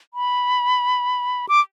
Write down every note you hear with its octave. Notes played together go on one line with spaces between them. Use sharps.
B5
D6